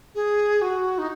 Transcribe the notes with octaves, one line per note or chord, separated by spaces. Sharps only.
G#4
F#4
D#4